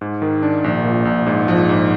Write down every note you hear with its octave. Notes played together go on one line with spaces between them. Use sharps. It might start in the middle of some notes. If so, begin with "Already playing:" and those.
G#2
D#3
D4
A#1
A#2
A#1
G#2
F3
G#2